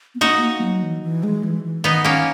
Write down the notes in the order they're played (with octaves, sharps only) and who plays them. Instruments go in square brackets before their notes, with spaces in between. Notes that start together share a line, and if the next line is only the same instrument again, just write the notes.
[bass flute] B3
[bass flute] A#3 [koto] D#4 F#4
[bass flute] A#3
F#3
E3
E3
G#3
E3
E3
[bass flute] D#3 [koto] B3 D#4
[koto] A#3 C#4